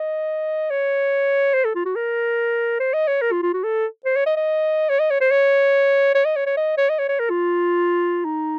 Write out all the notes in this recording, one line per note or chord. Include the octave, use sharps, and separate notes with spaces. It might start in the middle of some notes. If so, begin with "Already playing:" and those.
Already playing: D#5
C#5
C5
A4
F4
F#4
A#4
C5
D#5
C#5
A#4
F4
F4
F#4
A4
C5
C#5
D#5
D#5
C#5
D#5
C#5
C5
C#5
C#5
D#5
C#5
C#5
D#5
C#5
D#5
C#5
C#5
A#4
F4
D#4